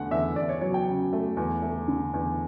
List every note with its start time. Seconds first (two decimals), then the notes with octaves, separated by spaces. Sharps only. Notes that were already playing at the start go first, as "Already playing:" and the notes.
Already playing: E2 D3 A3 F#5
0.11 E2 E5
0.36 E2 D5
0.49 C#5
0.61 F#3 C#5
0.74 G5
0.87 C#3
1.13 A3
1.37 E2
1.63 A3
1.88 D3
2.14 E2